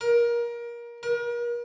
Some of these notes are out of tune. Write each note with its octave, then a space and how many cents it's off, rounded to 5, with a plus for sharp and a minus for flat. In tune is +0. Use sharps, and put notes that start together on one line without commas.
A#4 +25
A#4 +40